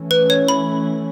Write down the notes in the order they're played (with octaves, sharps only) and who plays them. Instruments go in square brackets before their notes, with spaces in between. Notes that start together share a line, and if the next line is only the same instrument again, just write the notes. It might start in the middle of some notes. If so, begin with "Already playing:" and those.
Already playing: [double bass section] E3 A3 C#4
[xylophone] B4
C#5
B5